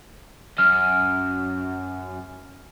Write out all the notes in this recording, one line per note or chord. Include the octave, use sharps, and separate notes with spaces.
F#2 F6